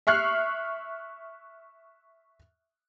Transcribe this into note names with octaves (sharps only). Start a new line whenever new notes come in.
E5 C#6 F6 F#6 C7